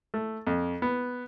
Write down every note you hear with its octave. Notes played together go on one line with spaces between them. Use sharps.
A3
F2
B3